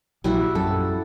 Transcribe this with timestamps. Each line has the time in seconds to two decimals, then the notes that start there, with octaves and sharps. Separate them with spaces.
0.24 A#1 F#3 G3 E4 F#4
0.55 F#2 A4